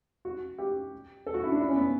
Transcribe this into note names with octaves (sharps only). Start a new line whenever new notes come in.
F#4
G4
A4
F#4
E4
D4
E4
C#4
B3